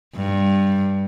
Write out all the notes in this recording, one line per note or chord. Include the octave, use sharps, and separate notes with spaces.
G2